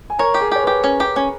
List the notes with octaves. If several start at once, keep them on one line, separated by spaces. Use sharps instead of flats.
G#5
A#4 C#5 A#5
G4
G#4 G#5
G4 C#5
G4 B4
C#4
G4
C#4